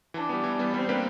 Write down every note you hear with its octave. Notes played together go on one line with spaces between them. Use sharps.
E3 D4
G3 B3
E3
G3 B3
G3 C4
A#3 D4 G4 B4